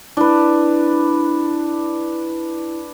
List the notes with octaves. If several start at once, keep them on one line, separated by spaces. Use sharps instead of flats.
D4 E4 B4